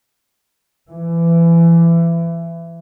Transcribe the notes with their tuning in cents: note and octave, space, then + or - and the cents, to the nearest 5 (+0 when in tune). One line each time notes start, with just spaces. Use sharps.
E3 +25